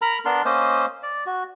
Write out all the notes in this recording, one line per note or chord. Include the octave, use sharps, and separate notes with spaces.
A#4 A#5 B5
B3 D4 A#4 C6
A#3 C#4 C5 D#5
D5
F#4